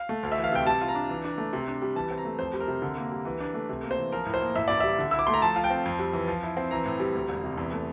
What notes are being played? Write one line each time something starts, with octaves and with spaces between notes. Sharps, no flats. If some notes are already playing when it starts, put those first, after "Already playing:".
Already playing: F5
A3
D2
E5
E3
F5
C3 G5
G3 A5
F4
A#5
D4
E3
D4
A3
C3
D4
G3
E3 A5
C4
A#5
A3
F2 C5
G3
A#4
C3
D3
A#3
G3
E3
D4
A3
C3
A#3
C5
E3
F3 A#4
A2
C5
A#3
A2 E5
A1 D5
G3 E5
D3
E4 E6
D6
A3 C6
A#5
F3 A5
F4
G5
C4
F2
G3
E3
F3
E4
C4
E3 A#5
A2
G3
D2
E1
C3
E2
A3